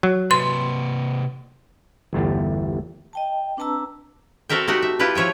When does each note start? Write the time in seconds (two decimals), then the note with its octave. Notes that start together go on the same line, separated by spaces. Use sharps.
0.03 F#3
0.31 C3 B4 C6
2.13 G1 E2 A3 G4
3.13 D#5 G5 A5
3.57 C4 D4 B4 A5 A#5 E6
4.49 C4 F#4 A4 A#4 E5 G5
4.68 A3 D#4 F#4 G4
4.82 E5
4.99 E4 F4 G4 B4
5.15 F3 C#5 E5 G5